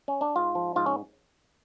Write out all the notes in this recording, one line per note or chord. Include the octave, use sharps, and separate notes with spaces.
C#4
D4
G#2 F4
F3
G#2 F4
C#4